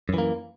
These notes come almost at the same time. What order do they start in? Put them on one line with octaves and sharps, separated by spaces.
F#2 E3 A#3